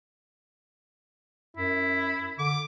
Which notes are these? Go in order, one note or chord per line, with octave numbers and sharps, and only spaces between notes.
F#2 E4
D3 D6